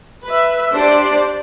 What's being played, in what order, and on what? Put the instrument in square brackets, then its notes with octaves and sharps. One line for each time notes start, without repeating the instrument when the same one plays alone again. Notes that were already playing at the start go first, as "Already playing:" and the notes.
[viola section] B4 E5
D4 G4 C5 D5